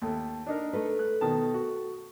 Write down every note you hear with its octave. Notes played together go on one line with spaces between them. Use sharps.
D#2 A3
D4 D#4 A#4
A3 A4 B4
F#6
B2 D#3 A5
F#4